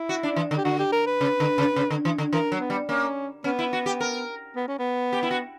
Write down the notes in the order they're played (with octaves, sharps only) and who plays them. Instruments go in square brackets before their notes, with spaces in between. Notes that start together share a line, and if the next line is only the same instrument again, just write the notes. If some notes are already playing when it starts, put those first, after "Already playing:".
Already playing: [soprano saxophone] E4
[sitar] F#4
D4
E3
D3
[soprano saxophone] G4
[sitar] D3 [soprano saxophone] F#4
[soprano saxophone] G4
A#4
B4
[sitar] C#3
D3
C#3
C#3
D3
E3
D3
[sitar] E3 [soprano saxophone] A#4
[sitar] F#3
[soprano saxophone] B3
[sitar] G3
[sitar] A#3 [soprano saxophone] C#4
[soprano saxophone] B3 [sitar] C#4
[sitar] E4
F#4
G4
A#4
[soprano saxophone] B3
C#4
B3
[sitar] G4
E4
F#4